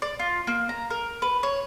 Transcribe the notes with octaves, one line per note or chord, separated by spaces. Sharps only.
D5
F4
A#3
A#5
A#4
B4
C#5